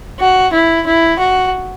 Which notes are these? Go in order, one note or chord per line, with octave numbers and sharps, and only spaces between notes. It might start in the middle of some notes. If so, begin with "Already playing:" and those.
F#4
E4
E4
F#4